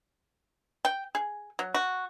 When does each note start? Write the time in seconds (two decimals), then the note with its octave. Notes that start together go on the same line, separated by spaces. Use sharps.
0.85 G5
1.15 G#4
1.59 F#3
1.74 F#4